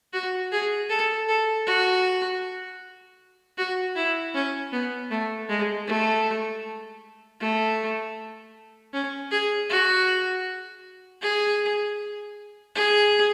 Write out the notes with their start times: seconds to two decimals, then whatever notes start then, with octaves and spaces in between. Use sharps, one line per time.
0.14 F#4
0.52 G#4
0.89 A4
1.28 A4
1.67 F#4
3.58 F#4
3.95 E4
4.35 C#4
4.73 B3
5.11 A3
5.49 G#3
5.87 A3
7.40 A3
8.93 C#4
9.31 G#4
9.69 F#4
11.22 G#4
12.75 G#4